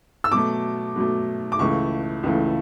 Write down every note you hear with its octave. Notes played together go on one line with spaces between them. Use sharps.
E6
B2 F#3 A3 D6
B2 F#3 A3
D6
C#2 C#3 E3 A3 C#6
C#2 C#3 E3 A3